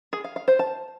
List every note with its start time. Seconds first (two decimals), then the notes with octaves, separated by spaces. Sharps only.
0.13 G#4
0.24 F5
0.36 F5
0.48 C5
0.59 A5